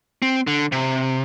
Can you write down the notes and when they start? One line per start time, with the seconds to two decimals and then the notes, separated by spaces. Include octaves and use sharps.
0.22 C4
0.47 D3
0.72 C3